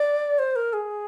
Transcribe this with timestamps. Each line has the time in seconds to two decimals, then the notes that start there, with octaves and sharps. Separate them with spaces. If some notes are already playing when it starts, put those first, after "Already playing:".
Already playing: D5
0.39 C5
0.56 A#4
0.73 G#4